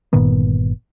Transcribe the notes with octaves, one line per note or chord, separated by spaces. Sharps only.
G1 A#2 D#3 B3